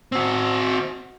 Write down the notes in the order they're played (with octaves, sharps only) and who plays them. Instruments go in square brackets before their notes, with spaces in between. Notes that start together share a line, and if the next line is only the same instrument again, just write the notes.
[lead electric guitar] C4 F#4